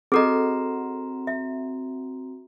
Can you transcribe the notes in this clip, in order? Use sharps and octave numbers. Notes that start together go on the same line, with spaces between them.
C4 F#4 G#4 A4 D#5 A#5
E5